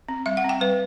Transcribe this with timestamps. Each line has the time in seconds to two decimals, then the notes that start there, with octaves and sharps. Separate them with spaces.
0.09 C4
0.26 G3 E5
0.37 F#5
0.44 C4
0.49 G5
0.61 G3 B4